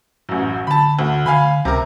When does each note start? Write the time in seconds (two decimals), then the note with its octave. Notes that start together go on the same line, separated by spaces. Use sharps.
0.29 A1 F#2
0.67 D3 A5 B5
0.99 D2
1.26 D3 F5 G#5 B5
1.65 C#2 C3 A#4